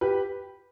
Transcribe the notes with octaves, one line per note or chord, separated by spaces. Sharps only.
G4 B4